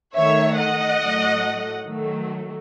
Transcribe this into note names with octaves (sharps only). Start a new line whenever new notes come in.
D#3 A3 C#5 E5
D#5 F#5
A2 F#3 A3
D#3 F#3 A3